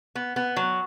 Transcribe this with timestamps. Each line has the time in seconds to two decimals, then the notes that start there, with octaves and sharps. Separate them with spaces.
0.15 B3
0.36 B3
0.57 F#3